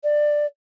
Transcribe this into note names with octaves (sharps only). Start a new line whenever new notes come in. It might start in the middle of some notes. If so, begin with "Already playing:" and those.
D5